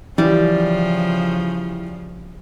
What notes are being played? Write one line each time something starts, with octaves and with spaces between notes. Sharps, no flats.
C#3 E3 F3 G3 G4